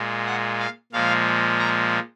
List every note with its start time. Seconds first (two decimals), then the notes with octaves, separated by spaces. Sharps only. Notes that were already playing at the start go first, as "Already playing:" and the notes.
Already playing: A#2 G#3
0.26 F#5
0.60 F5
0.92 A#2 F3 G#3 F5
1.59 A#5